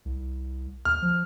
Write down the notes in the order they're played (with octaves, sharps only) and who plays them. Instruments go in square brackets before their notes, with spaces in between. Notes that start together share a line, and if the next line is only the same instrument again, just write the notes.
[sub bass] C2
[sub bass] D#2 [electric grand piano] F6
[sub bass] F3